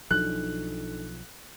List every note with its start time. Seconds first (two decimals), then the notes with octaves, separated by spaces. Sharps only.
0.11 B1 F3 F#3 D4 D#4 A4 F#6